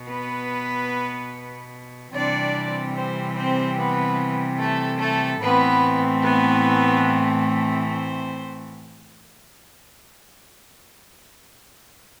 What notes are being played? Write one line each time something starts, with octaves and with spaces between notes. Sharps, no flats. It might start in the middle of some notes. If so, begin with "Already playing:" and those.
Already playing: B2
B3 B4
C3 E3 G3 C4 D4 D5
C4 C5
C4 C5
B3 B4
A3 A4
A3 A4
A2 E3 A3 B3 C4 B4
B3 B4
C4 C5